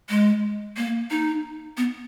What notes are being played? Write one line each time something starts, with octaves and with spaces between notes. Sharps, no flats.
G#3
A#3
D#4
B3